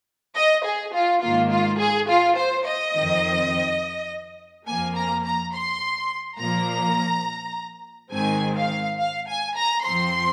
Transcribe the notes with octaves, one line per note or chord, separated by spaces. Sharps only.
D#5
G#4
F4
G#2 D#3 A#3 F4
F4
G#4
F4
C5
D#5
F2 D#3 C4
F2 F3 A#3 G#5
A#5
A#5
C6
A#2 F3 A#3 A#5
G#2 D#3 G#3 C4 G#5
F5
F5
G#5
A#5
F2 F3 C4 C6